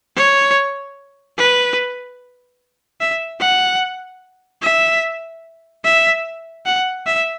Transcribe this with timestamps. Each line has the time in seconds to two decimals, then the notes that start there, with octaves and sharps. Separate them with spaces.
0.16 C#5
1.38 B4
3.00 E5
3.40 F#5
4.62 E5
5.85 E5
6.66 F#5
7.06 E5